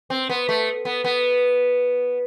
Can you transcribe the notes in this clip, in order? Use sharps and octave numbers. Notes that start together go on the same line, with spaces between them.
C4
B3
A3
B3
B3